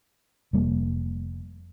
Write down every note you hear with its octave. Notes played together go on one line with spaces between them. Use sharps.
F1 G3 A#3